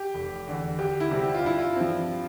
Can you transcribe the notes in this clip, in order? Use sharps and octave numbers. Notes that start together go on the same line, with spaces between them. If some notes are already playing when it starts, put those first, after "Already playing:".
Already playing: G4
F1
E2 D3
D2 G4
E4
C3 G3 C4
G4
F4
G2 E4
F4
F3 C4